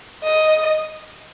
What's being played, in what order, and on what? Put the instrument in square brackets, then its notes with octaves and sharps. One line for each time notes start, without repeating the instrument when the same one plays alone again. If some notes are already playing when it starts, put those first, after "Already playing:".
[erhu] D#5